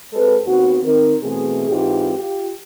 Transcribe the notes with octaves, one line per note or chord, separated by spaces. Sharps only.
G#3 C4 G4 A4 B4
D#2 B3 C4 F#4
D#3 C4 A#4
B2 E3 A3 C4 G#4
G#2 E3 C4 F4 G4
F4 G4